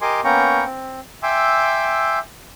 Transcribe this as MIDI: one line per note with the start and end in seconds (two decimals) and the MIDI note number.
0.01 0.21 67
0.01 0.21 70
0.01 0.21 75
0.01 0.21 80
0.01 0.21 84
0.01 0.21 86
0.24 0.64 58
0.24 0.64 59
0.24 0.64 61
0.24 0.64 79
0.24 0.64 82
0.24 0.64 85
0.65 1.00 60
1.23 2.19 76
1.23 2.19 79
1.23 2.19 80
1.23 2.19 84
1.23 2.19 86
1.23 2.19 88